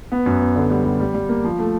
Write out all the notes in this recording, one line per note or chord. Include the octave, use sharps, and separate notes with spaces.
B3
F#2
B3
D3
G3
G3
G3
G3
A#3
F3
A3